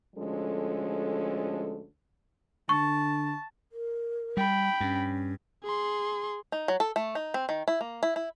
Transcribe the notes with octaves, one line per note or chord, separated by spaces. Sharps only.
D2 F3 G#3 C#4 A4
D3 A5 C#6
A#4
G3 G5 B5
G2 C#4
G#4 C6
D#4
F#3
A4
A3
D#4
C4
D#3
E4
A#3
E4
E4